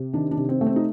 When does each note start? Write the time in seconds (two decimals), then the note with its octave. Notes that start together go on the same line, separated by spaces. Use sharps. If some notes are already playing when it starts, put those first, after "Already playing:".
Already playing: C3
0.13 D#3 D4
0.31 D4
0.37 C3
0.49 C4
0.61 A3
0.67 C4
0.76 D#4